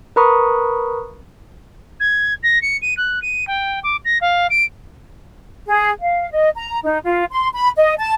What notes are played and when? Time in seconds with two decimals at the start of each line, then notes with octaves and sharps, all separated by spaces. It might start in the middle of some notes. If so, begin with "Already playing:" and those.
0.16 A#4 B4 A#5 B5 C#6 D#6
2.00 G#6
2.43 A#6
2.62 C#7
2.82 D#7
2.97 F#6
3.22 D#7
3.47 G5
3.83 D6
4.05 A#6
4.21 F5
4.50 D7
5.67 G#4
6.01 F5
6.31 D#5
6.56 A#5
6.84 D#4
7.04 F4
7.30 C6
7.54 B5
7.77 D#5
7.99 A5